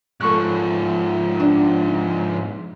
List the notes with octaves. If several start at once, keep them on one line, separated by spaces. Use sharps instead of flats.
G#2 F3 A4 C#6 F#6
D4